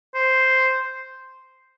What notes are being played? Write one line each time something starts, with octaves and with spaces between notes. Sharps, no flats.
C5